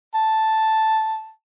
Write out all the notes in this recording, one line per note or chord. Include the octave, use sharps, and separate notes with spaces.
A5